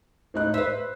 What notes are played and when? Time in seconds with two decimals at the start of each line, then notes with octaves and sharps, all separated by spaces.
0.34 A2 D#4 F#6
0.54 B4 C5 E5